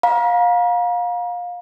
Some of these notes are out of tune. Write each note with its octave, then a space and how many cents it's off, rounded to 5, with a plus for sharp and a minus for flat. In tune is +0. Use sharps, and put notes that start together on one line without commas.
F5 +25 A#5 +35